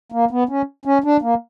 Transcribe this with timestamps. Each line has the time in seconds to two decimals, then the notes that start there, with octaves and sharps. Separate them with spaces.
0.12 A#3
0.31 B3
0.49 C#4
0.85 C#4
1.04 D4
1.22 A#3